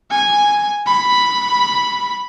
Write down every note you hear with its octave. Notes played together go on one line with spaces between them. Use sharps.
G#5
B5